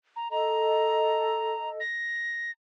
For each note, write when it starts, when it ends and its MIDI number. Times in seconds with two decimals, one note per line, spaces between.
0.16 0.31 82
0.31 1.79 69
0.31 1.79 75
0.31 1.69 82
1.80 2.51 94